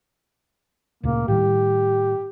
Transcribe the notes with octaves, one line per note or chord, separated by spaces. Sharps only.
D2 A#2 C#3 A#3
A2 D#3 G3 G4